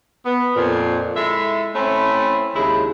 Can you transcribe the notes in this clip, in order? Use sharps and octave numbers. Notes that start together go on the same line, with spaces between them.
B3
F2 A#2
G#3 E4 A4 E5
A3 C4 C#4 E4
D#2 C#3 G#3 E4